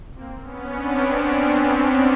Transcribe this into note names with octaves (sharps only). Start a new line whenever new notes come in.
A#3 C4
B3 C#4
C4 D4
C4 D4
B3 C#4
C4 D4